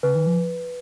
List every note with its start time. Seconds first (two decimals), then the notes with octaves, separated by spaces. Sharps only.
0.03 C#3 B4
0.15 D#3
0.26 F3